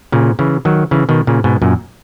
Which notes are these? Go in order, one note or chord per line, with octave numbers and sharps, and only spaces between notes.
A#2 C#3
C#3 E3
D#3 F#3
C#3 E3
B2 D#3
A#2 C#3
G#2 B2
F#2 A#2